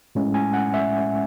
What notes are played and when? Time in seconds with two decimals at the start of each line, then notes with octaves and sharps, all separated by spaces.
0.15 A2 G#3 C#4
0.34 G#5
0.54 F#5
0.74 E5